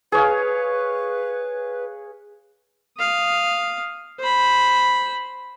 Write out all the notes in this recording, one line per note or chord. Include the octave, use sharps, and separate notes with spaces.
G#4 B4 C#5 F5
F5 D#6
C5 B5